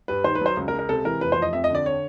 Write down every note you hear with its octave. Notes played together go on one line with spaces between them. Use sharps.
G2 B4
D#3 C5
B4
F#3 C5
C#2
A#4
G#3
A#4
C3 A4
E3 A#4
F1 B4
C5
F3 D#5
F2 E5
D#5
D3
D5
C#5